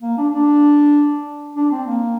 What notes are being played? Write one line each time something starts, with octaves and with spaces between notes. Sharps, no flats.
A#3
D4
D4
D4
C4
A#3